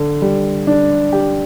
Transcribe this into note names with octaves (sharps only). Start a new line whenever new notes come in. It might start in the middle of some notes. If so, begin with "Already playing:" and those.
Already playing: D3
G3
D4
G4